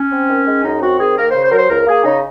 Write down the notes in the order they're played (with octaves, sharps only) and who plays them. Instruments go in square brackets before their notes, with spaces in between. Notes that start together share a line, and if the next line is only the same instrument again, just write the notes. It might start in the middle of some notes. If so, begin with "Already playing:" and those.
Already playing: [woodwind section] C#4
C4
D#3
G#3
F#2 D#4
C4 F#4
D#3 G#4
A#3 A#4
C#3 C5
C5
F#3 A#4
C5
C#2 A#4
A#3 G#4
C#3 D#4